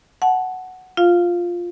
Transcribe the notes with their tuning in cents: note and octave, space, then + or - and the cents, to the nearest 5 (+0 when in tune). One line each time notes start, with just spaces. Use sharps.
F#5 +0 A5 -20
F4 +0 F5 +0